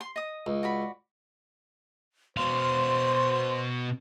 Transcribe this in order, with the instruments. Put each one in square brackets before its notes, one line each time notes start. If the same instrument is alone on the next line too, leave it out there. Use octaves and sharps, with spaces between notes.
[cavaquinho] C6
D#5 D#6
[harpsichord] C#2
[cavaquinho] F#4 D5 B5
[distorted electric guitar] B2 F5 [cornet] C5 [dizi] C6